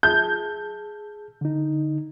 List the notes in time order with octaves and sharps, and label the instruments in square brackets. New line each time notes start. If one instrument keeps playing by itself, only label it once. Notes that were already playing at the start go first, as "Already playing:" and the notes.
[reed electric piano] G#4 A5 [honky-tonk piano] G6
[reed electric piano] D3 D#4